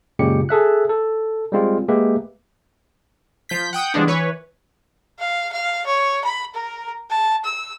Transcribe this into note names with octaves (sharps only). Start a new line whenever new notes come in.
F#2 A#2 C#3 G#3 G4 C#7
G#4 A4 E5 F#6
A4
G3 G#3 C4 F4
G#3 A#3 G4 B4 E5
F3 G6 B6
F#5 G5 D#6 G6
E3 F3 G3 G#3 B3 D4
E3 B4 C#5
F5
F5
C#5
B5
A#4
A5
E6